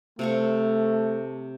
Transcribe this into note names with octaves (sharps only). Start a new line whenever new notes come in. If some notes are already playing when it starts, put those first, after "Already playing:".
C3 A3 F5 C#6